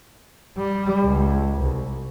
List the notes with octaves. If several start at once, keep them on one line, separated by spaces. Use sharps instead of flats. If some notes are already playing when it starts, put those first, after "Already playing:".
G3
C#2
C2